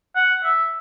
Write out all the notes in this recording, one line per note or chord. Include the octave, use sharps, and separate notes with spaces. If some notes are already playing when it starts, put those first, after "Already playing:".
F#5
E5